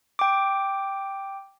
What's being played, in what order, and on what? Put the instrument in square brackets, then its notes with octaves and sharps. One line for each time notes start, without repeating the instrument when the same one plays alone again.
[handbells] G5 D6